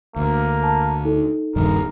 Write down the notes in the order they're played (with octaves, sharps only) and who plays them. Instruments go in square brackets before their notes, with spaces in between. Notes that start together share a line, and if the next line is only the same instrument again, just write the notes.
[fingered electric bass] D2 [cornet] A#3
[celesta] A5
D#4 A4
[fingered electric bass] D#1 G2 D#3 [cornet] A#4